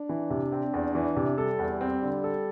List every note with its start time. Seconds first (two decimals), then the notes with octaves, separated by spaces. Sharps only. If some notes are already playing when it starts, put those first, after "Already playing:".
Already playing: D4
0.09 E3
0.30 C3
0.52 C4
0.73 E2
0.95 E3
1.16 C3
1.38 G3 A4
1.59 E2
1.81 C4
2.02 D3
2.24 A4